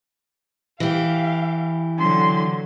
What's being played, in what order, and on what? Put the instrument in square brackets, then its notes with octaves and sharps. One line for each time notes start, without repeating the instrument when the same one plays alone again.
[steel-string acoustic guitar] E3 G4 [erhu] F5
[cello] D3 F#3 [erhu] C6